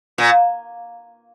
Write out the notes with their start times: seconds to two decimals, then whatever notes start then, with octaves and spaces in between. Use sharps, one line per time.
0.18 A#2